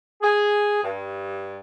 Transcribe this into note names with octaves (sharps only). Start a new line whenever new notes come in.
G#4
G2